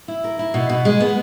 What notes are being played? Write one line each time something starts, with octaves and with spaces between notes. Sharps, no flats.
E4
A#4
E4
B2
B2
G#3
B3